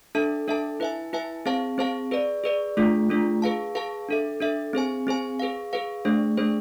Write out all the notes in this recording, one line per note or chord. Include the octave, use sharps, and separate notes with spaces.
D4 A4 E5 A5
D4 A4 E5 A5
E4 B4 E5 G#5
E4 B4 E5 G#5
C4 G#4 C5 F5 A5
C4 G#4 C5 F5 A5
G#4 B4 D5
G#4 B4 D5
A3 D4 F4 G#4
A3 D4 F4 G#4
G#4 B4 F5 A5
G#4 B4 F5 A5
D4 A4 E5
D4 A4 E5
C4 G#4 C5 G#5
C4 G#4 C5 G#5
G#4 B4 F5
G#4 B4 F5
A3 D4 G#4 C5
A3 D4 G#4 C5